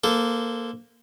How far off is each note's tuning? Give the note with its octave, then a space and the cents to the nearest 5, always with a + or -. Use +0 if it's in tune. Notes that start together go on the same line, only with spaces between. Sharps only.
A#3 +0 A4 +0 C5 -25